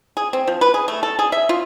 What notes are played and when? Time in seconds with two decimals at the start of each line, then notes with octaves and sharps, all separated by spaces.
0.17 G#4
0.33 C4
0.47 F3
0.61 B4
0.74 G#4
0.88 A3
1.03 A4
1.19 G#4
1.32 E5
1.49 F4